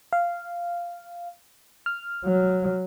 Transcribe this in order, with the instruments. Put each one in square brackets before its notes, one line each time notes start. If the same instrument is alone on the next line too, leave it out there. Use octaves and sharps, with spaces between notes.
[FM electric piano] F5
F6
[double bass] F#3